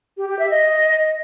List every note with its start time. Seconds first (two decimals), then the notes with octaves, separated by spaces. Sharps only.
0.17 G4
0.28 G4
0.39 E5
0.49 D#5